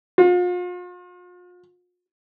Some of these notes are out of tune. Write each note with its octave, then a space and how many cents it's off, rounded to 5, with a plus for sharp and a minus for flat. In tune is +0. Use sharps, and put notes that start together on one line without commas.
F4 +40